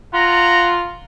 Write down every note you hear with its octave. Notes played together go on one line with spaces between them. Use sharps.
F4 F#5 A#5